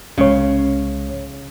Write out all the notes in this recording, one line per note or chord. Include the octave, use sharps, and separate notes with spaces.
C2 C#3 G#3 C#5